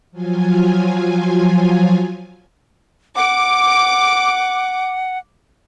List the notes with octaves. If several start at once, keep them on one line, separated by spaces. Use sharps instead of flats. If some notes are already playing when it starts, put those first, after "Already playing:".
F3 F#3 F4 G#5
F#5 D6